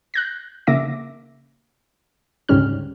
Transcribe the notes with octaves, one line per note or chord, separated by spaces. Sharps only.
F#6 G6 A#6
C#3 A#3 E5 D6 A#6
D2 G#2 C#3 G3 C#4 F6